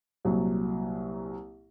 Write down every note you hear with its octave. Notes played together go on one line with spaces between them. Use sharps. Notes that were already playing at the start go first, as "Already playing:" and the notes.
C2 A#2 F#3